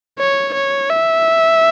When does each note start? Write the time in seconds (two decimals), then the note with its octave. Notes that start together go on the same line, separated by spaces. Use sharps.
0.19 C#5
0.55 C#5
0.90 E5